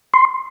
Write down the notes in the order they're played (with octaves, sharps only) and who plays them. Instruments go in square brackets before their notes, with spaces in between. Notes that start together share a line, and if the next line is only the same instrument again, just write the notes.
[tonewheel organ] C6